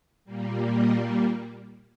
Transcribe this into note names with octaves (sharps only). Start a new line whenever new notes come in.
A#2 G3 A#3
D#5